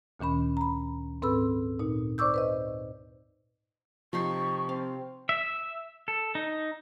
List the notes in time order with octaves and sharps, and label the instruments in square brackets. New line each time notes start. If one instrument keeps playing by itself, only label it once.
[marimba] D2 A#2 D#3 C#4 B5
A#5 B5
G#2 C4 A4 B4 B5 E6
A#2 D#4
C5 D5 C#6 D6 E6 G6
B4 C5 D#5
[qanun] C3 D#4 C6 [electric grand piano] F3 [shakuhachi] C#6
[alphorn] C4 [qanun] F5
[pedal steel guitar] E5
A4
D#4